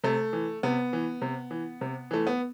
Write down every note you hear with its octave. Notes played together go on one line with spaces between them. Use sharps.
C3 A3
E3
C3 B3
E3
C3
E3
C3
E3 A3
B3